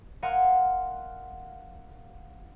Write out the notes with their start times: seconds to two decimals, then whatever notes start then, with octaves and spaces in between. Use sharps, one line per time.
0.22 A#4 D#5 F5 F#5 G#5 C6